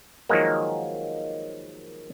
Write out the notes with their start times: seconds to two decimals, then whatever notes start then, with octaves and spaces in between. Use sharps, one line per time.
0.29 D#3 F3 F#3 G#3 A#3